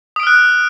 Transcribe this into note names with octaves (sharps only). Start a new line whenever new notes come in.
D#6 F6 F#6 D7